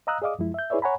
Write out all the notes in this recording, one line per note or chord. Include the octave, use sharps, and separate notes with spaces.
D#5 F5 A#5 D#6 E6 F#6
G#4 D5 D#5 F5 D6 D#6
F#2 F3 G#3 E4
E5 G6
E4 G#4 B4 C#5 D5 E5
C#5 F#5 G#5 A#5 B5